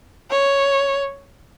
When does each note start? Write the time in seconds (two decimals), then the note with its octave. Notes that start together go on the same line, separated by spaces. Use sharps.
0.30 C#5